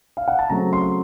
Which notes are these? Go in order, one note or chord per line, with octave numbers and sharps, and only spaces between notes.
F5
F#5
A5
C#3 F#3 A3 C4 A#5
C6